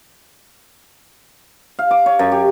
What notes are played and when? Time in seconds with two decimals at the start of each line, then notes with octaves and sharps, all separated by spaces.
1.79 F5
1.91 D6
2.06 C#5
2.19 F#2
2.32 G4